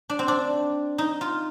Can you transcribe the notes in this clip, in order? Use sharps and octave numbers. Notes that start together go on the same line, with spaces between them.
D4
C4
D4
D#4
F4